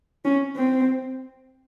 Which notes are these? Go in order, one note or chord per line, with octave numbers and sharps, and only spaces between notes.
C#4
C4